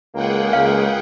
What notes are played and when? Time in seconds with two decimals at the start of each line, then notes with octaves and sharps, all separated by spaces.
0.15 C#2 A#3 G#4 F#5 G5
0.53 C#2 F5